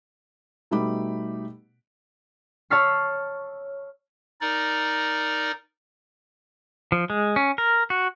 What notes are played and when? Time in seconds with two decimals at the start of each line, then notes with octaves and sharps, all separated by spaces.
0.71 B2 G3 A3 D#4 B5 D6
2.70 C#5 A5 E6 F6 B6 C7
4.41 D#4 A#4 D5
6.92 F3
7.10 G#3
7.36 C#4
7.58 A#4
7.90 F#4